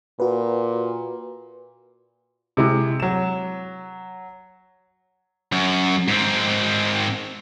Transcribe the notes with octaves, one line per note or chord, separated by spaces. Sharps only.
A#2 F#4 B4
C3 G#3 E4
F#3 E7
F#2
G#2 C4